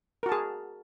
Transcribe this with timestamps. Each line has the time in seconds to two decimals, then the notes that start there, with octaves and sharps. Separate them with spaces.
0.23 A#4
0.26 F#4
0.29 A5
0.32 G#4